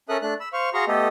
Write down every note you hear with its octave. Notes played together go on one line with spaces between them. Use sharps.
C#4 A4 A#4 E5 D#6 F#6
A3 D4 F#6
B5 E6
C5 F5 C#6
F#4 G#4 F5 A#5 C6 C#6
A3 B3 G4 A4 D#5